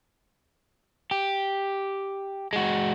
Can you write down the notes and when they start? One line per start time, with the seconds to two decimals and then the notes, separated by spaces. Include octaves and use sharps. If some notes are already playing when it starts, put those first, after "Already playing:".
1.11 G4
2.53 G#3 F#4